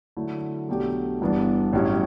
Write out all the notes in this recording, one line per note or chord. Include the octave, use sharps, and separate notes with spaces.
D3 F#3 A3 E4
B1 B2 A3 D4 G4
G1 G2 E3 B3 D4
A1 G2 F#3 C#4 E4